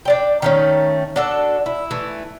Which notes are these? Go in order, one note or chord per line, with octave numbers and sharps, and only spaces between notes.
D4 D5 G5
D#3 A3 C#4
D4 F#4 A4
E4
E3 A3